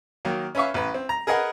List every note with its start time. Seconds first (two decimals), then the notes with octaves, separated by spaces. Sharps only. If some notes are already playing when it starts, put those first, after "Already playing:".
0.25 D#3 F#3 A#3
0.55 C#4 B4 C#5 E5 F5 C#6
0.74 A1 B4
0.94 C4
1.09 A#5
1.27 G#4 A#4 B4 D#5 F#5 G#5